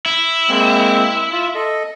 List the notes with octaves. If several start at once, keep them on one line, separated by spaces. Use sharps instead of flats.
E4
G#3 A#3 C4
F4
A4 D#5